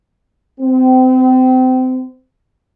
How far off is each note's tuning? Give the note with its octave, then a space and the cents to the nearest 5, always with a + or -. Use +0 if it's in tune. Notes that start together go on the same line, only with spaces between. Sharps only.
C4 -30